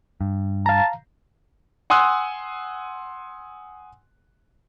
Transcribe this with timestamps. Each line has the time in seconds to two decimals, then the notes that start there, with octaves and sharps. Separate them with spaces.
0.21 G2
0.66 F5 A5 A#5
1.90 F#5 G#5 C6 D#6 E6 F#6